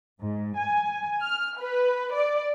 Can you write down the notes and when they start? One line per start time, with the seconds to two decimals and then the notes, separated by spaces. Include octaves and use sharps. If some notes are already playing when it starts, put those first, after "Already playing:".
0.20 G#2
0.56 G#5
1.22 F6
1.58 B4
2.13 D5